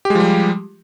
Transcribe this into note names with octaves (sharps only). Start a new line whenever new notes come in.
F3 G3 G#3 G4